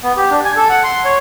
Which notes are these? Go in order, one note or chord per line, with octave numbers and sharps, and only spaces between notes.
B3
G4
D4
G#5
A4
F#5
C6
C#5